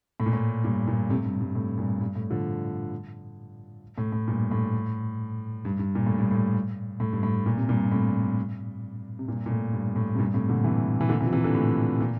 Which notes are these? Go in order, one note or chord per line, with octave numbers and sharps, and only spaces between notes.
A2
A#2
A2
G2 A#2
G2 A#2
A2 C3
G2
G2
A2
G2 A#2
G2
A2
D3 F3
A2
A2
G2 A#2
A2
G2
G2
A#2
A2
G2
A2
A2
G2
A2
A#2
C3
G2 A#2
A2 C3
C3
G2 A#2
A#2
A2
G2
A2
C3
G2 A#2
A2 C3
A#2 D3
C3 E3
E3
A#2 D3
C3 E3
F3
C3 E3
A#2 D3
A2 C3
A#2